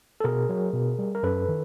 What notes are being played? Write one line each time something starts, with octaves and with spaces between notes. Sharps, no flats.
A4
B2 G#4 A#4
F#3
B2
G3
A#4
F#2 A4 B4
D#3